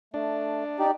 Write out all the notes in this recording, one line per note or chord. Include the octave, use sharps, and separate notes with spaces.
A3 D4
D#4 G4 D5